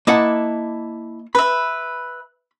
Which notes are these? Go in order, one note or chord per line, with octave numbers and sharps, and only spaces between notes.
A#3 E4 D#5 F#5 A5 D6
B4 E5 B5